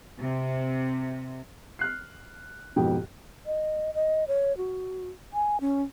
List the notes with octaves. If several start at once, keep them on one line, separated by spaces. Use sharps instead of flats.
C3
F6 F#6 C7
F2 G#2 B2 G4 G5
D#5
D#5
C#5
F#4
G#5
C#4